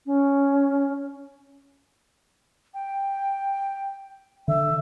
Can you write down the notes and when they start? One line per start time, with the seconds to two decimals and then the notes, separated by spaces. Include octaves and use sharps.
0.06 C#4
2.74 G5
4.48 D3 E5